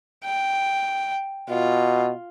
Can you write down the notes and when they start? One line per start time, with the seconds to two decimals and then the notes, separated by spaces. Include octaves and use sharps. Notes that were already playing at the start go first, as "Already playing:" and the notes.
0.25 G5
1.49 B2 F4